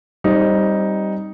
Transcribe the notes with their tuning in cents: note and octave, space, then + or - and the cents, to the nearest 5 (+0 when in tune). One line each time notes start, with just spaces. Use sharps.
G3 +0 C4 +25 D#4 +5